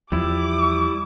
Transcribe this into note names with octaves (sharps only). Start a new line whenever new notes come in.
E2 F3 G3 E4 D6